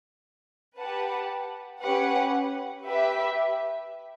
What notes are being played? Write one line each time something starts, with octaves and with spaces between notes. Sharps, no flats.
G4 B4 F#5 A5
C#4 G4 B4 F#5
G4 B4 E5